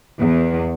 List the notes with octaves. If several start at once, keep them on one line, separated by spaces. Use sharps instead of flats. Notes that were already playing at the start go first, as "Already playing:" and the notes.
E2